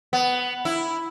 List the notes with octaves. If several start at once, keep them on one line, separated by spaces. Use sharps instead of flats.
B3
E4